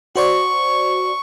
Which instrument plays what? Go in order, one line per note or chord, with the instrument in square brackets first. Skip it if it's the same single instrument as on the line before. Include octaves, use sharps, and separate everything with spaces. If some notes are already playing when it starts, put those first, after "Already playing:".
[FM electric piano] F#4 C5 D5 [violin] C#6